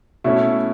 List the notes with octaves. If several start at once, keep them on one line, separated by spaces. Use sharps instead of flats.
B2 A3 C#4 E4